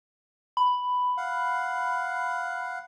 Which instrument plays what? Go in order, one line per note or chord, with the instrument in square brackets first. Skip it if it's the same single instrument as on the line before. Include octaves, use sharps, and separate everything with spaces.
[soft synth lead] B5
[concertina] F5 F#5